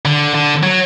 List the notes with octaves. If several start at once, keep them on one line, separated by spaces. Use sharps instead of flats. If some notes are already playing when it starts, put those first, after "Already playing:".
D3
D3
F#3